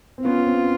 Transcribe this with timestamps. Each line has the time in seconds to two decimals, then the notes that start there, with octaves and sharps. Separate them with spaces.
0.18 C4
0.25 B3 C#4 F4
0.37 B3
0.46 C4
0.55 C#4